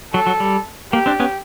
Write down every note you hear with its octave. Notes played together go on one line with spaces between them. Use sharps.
F#3 A4
F#3
G3
A#3 G4
C4 D4
B3 C#4